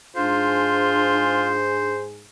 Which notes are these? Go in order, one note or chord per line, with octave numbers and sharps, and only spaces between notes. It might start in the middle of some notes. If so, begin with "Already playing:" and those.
G#2 D4 F4 G#4 C5